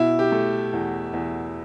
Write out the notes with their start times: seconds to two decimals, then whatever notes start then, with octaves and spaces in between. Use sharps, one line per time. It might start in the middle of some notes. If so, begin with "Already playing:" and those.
Already playing: B2 E4
0.19 G4
0.32 A3
0.73 E2
1.13 E2